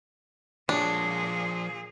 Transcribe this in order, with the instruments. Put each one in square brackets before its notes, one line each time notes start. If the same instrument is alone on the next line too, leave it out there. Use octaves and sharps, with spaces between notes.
[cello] A#2 G#4 [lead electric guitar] F3 C#5 [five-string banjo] D4